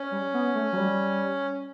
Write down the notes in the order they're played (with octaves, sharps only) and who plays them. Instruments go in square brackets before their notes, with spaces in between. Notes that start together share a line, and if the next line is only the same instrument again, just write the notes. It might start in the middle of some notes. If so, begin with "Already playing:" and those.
Already playing: [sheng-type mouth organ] C#4
[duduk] G3
B3
A3
F#3
G3